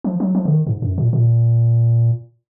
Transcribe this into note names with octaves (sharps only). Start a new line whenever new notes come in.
F3
F#3
F3
C#3
D#3
G#2
F#2
A#2
A#2